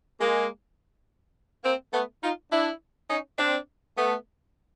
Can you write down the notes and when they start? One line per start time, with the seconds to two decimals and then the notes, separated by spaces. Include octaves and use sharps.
0.20 G#3 A#3
1.64 A#3 C4
1.93 A3 B3
2.22 D#4 F4
2.51 D4 E4
3.10 C#4 D#4
3.38 C4 D4
3.96 A3 B3